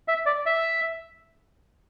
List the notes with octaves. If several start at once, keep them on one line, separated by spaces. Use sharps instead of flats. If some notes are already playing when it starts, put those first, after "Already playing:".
E5
D5
E5